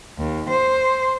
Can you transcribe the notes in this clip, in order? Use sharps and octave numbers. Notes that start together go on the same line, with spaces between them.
D#2
C5